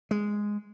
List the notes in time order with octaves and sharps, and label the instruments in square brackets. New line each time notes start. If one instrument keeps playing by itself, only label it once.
[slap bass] G#3